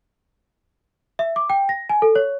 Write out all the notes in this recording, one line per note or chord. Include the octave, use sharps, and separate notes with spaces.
E5
D6
G5
A#6
G#5
A4
C#5